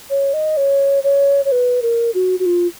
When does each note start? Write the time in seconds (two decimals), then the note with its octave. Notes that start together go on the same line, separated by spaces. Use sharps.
0.10 C#5
0.33 D#5
0.57 C#5
1.04 C#5
1.45 C#5
1.52 B4
1.82 A#4
2.14 F#4
2.39 F#4
2.46 F4